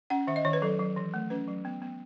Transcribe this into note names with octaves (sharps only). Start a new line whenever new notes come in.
C#4 F#5
D#3 E5
D#5
D#3 C#5
B4
F#3 A4
F#3
E3
A3
C#4 B4
F#3
B3
B3